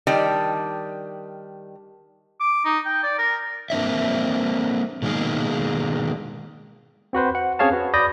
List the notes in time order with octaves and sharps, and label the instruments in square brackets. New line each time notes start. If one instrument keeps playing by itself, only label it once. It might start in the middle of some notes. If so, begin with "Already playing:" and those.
[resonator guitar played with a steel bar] D#3 G3 D4 G5
[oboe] D6
D#4
G5
D5
A#4
[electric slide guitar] A#3 C4 D4 D5 E5
B2 D#3 G#3 A#3 G#4
[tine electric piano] C4 F#4 B4 C5
F#5
C4 C#4 G#4 C#5 F5 A5
F#4 B4
D5 B5 D#6 G6 A#6